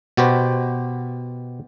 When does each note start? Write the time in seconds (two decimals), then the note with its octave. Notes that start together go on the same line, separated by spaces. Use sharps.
0.17 B2 F#4 G4 B4 C5